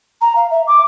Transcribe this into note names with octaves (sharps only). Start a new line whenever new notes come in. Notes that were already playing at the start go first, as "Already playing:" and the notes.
A#5
F5
E5
D6